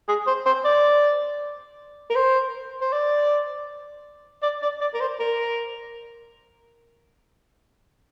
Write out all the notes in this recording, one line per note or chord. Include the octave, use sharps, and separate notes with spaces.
G#4
C5
C5
D5
A#4
C5
C5
D5
D5
D5
D5
A#4
C5
A#4